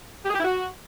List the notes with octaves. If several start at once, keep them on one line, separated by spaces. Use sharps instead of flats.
G4
G#4
G4
E4
F#4